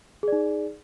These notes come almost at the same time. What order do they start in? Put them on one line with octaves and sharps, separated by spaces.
G#4 D5 D#4